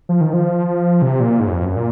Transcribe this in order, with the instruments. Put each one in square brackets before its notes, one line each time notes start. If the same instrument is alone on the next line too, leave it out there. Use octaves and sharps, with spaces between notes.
[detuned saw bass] F3
D#3
F3
C3
A#2
G#2
F#2
F2
F#2
A#2